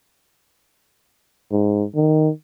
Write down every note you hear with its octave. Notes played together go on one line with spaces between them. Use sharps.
G#2
D#3